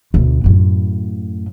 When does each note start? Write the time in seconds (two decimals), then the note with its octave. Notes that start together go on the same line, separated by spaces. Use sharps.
0.14 D2 B2
0.44 F#2 A2